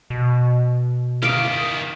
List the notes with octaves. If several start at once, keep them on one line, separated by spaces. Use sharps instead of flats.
B2
D#3 E4 F5 D6